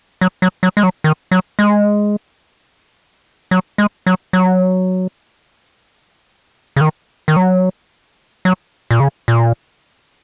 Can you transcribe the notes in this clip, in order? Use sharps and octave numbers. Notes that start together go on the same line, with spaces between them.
F#3
F#3
F#3
G#3
F#3
D#3
F#3
G#3
F#3
G#3
F#3
F#3
C#3
D#3
D#3
F#3
F#3
A#2
C#3
A#2